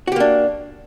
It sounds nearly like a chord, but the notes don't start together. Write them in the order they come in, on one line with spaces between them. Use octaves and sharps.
F#4 G4 A#3 D4